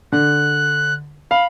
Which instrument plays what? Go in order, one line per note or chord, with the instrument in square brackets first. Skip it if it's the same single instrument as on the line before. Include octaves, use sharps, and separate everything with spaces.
[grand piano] D3 [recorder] F#6
[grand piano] F5 [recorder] B5